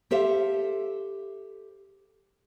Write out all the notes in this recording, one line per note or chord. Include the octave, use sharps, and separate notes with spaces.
G4 A4 C5 E5 F5